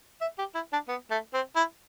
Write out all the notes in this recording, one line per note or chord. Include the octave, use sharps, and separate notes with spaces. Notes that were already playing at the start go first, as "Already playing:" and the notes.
E5
G4
E4
D4
B3
A3
C4
E4